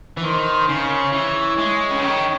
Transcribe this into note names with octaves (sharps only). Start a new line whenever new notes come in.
E3
D#3 C5
C#3 C#5
E3
G#3
C#3
D#3